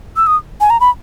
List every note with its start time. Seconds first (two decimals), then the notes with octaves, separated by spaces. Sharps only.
0.17 E6
0.27 D#6
0.61 G#5
0.70 A#5
0.80 B5